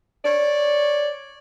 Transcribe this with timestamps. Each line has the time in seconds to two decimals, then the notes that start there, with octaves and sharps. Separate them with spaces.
0.24 C#5 D5